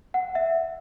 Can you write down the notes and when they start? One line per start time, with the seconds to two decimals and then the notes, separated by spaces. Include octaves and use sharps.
0.14 F#5
0.35 E5